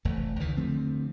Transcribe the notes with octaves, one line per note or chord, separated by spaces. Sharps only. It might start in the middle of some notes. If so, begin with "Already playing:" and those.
F1 E2 A3
C#2 D#3 E3
D3 F3 A3 C4